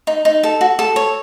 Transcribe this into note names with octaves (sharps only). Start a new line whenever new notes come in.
D#4
D#4
A4
F#4
A4
C#5